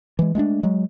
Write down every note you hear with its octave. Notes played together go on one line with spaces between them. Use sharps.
E3 G#3
G#3 A3 C#4 D4
F#3 G#3